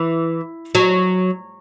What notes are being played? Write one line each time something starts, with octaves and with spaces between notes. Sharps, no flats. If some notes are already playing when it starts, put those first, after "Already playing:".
Already playing: E3
F#3